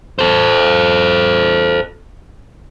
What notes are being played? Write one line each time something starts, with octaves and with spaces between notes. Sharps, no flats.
A4 C5